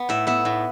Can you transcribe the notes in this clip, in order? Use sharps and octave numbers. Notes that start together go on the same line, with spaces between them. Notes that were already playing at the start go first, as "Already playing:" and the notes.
Already playing: B3
A2 E5
B3 E5
A2